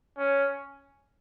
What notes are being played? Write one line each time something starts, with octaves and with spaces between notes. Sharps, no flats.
C#4